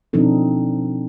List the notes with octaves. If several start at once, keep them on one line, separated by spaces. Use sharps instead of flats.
B2 F3 C4 D4 D#4 A4